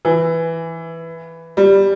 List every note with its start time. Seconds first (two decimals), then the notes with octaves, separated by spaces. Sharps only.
0.05 E3
1.57 G3